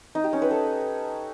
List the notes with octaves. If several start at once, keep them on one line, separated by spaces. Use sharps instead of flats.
D#4
G4
C#4
B4
A4